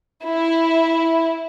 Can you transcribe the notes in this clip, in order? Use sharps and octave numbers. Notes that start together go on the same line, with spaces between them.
E4